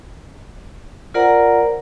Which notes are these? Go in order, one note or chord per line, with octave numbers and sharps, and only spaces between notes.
F4 A#4 C5 D5 F#5 A#5